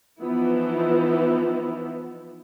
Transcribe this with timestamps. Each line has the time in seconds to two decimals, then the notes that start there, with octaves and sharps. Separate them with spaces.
0.20 E3 F3 B3 D#4 E4